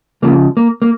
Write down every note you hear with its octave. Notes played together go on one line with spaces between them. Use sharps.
C#2 C#3 F3 A#3
A#3
A#3